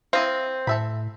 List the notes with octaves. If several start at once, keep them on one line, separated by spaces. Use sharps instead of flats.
C4 E4 D#5 F5
A2 A4 E5 B5